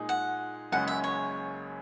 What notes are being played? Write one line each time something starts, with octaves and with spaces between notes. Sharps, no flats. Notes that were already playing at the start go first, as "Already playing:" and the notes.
Already playing: A#2 G#3 D#4 G#4
F#5
F#1 F#2 C#3 G#3 C#4 F#5
E5
C#5